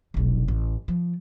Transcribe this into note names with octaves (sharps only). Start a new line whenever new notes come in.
F1 B1
A1
F3